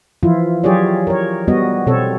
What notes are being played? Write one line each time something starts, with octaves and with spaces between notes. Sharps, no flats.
E3 F3 E4 F4
F#3 F4 G4 G#4 C#5 D5
A#4 C#5
G3 B3 F#4 D#5
B2 C4 A4 C#5